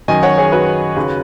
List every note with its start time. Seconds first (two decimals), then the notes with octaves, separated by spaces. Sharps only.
0.08 F#2 D#3 F#3 D#5 G#5
0.23 C#5 F#5
0.38 G#4 C#5
0.52 F#4 B4
0.96 D#2 C#3 F#3